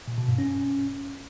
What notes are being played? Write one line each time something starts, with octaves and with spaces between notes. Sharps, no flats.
A#2
B2
G2
C#4